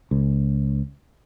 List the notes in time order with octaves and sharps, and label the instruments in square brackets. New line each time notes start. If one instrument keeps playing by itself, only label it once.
[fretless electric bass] C#2